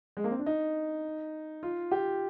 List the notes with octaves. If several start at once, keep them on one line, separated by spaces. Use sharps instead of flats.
G#3
A#3
C4
D4
D#4
F4
G4